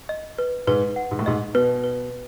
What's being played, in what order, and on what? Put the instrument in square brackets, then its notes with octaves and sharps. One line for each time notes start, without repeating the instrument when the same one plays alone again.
[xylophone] D#5
B4
[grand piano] G#2 [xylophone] B4
[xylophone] F#5
[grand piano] G#2
A2
[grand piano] G#2 [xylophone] D#5
[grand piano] B2 [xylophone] B4
[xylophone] B4